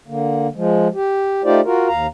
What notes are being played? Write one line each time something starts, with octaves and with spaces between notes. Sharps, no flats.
D3 A#3
F3 G#3
G4
A3 D#4 F4 G4 C5 D5
F4 F#4 A#4
D#2 F5 A#5